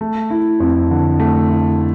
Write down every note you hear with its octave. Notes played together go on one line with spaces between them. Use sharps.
A3
E4
F2
D3
A3
E4